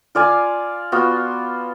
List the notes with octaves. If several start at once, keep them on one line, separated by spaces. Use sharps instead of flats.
F4 D5 F5 G#5
B3 F4 F#4